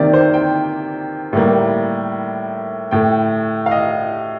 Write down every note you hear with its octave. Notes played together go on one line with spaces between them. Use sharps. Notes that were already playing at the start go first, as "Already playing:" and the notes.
Already playing: C3 D#3 A#3 D5
C5
G5
A2 G3 A#3
A2 A3 G5
F5
D#5